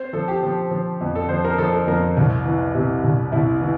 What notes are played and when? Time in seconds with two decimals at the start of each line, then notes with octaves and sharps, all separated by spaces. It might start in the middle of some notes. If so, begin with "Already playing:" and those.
Already playing: C4 C5
0.13 F3 A4
0.28 G4
0.43 F3
0.71 F3
1.01 F2
1.15 A4
1.29 F3 C5
1.44 A#4
1.58 F3 A4
1.73 A4
1.87 F2 A#4
2.17 C2
2.45 E3
2.75 C3
3.04 C2
3.32 C2 E4
3.61 E3